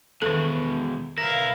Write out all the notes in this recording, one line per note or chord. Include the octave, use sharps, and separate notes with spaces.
E2 B2 D#3 A4
B1 E4 A#4 F5 A#6